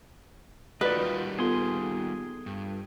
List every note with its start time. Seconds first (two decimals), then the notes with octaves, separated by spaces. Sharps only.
0.81 D#3 A3 F4 F#4 B4 D5 D#5
0.96 D#3 G3
1.39 B3 F4 G#4 A4 C6
2.46 G2